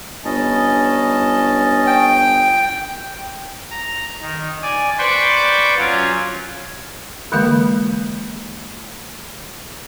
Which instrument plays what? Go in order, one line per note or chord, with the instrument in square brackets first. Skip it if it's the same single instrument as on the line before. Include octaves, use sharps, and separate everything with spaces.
[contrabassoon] G1 [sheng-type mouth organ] C#4 D#5 A5
[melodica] G5
[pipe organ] A#5
D#3
D5 G#5
B4 C5 D5 G5 C#6 D6
F#3 C#4 F4
[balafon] D3 E3 G#3 A#3 F5